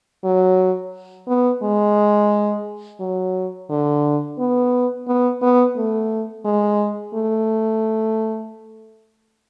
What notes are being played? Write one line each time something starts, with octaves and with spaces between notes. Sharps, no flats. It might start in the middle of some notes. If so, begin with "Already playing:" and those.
F#3
B3
G#3
F#3
D3
B3
B3
B3
A3
G#3
A3